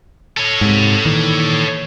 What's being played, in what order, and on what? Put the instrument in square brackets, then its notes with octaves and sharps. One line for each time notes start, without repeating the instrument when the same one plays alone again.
[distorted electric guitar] A4 C#5
[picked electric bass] G#2 C3
A#2 D#3 E3